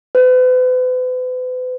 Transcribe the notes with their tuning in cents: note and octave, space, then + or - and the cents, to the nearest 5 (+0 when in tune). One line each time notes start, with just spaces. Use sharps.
B4 +40